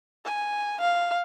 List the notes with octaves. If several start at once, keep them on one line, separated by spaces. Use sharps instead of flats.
G#5
F5